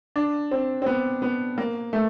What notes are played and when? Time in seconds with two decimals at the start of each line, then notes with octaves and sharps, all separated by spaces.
0.16 D4
0.51 C4
0.82 C4
0.86 B3
1.22 B3
1.58 A#3
1.93 A3